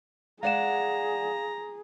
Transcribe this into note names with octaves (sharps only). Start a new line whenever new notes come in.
G#3 G#4 D5 F5 F#5 A#5 E7